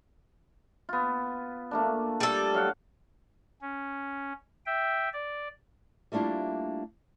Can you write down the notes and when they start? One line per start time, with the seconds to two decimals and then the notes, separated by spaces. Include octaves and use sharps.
0.89 B3 F4
1.71 A3 A#3 D4
2.20 G3 A4
2.54 F#3 F5 F#5
3.61 C#4
4.66 E5 G5
5.13 D5
6.12 G3 A3 A#3 D4 E4 F4